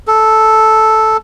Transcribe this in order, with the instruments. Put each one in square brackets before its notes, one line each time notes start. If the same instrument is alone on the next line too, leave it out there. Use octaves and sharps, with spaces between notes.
[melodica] A4